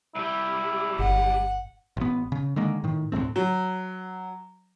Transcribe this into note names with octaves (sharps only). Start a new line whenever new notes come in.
C2 G3 E4
G1 F#5
A1 B3
C#3
D3 D#3 G#3 A#3
A2 D#3
D2 A2 A3 C4
F#3